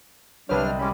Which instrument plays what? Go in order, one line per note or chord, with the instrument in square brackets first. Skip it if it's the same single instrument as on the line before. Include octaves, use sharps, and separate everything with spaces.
[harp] C2 G4 [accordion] G3 D4 F6 [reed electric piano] B4 C#5
[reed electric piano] D#5
[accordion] G3 G#3 C#4 [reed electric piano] B5 D6